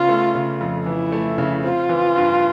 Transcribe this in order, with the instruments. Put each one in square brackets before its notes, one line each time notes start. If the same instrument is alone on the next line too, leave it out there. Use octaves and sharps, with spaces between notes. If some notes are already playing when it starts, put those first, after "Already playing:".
Already playing: [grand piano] C#3 B3 [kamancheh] F4
[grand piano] A3
C#3
F2
[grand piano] E3 [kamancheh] E4
[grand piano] A3
C#3
[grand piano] C4 [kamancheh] F4
[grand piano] E3
G2